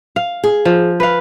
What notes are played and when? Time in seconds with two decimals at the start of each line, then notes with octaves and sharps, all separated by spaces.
0.16 F5
0.44 G#4
0.65 F3
1.00 B4 F5